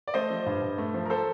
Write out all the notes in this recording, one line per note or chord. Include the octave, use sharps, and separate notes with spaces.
D5
A3 C5 D#5
F3
G2
G2
A3
F3
A#4
A4 C5